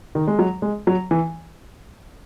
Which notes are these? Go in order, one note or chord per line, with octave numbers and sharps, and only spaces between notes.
D#3
G#3
F#3
G#3
F#3
E3